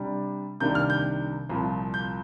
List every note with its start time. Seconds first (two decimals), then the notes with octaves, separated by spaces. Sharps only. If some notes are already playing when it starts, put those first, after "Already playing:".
Already playing: C3 G3 D4
0.60 C2 C3 D#3 A#3 D4 G6
0.75 F6
0.90 G6
1.49 C2 A#2 F3
1.94 G6